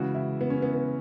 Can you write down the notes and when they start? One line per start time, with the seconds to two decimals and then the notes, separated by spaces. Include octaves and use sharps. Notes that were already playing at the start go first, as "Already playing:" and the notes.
Already playing: C#3 E3 G#3 F#4
0.15 E4
0.41 B3
0.50 C#4
0.62 B3
0.74 B3